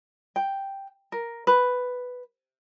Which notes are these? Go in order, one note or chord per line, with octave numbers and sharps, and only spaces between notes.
G5
A#4
B4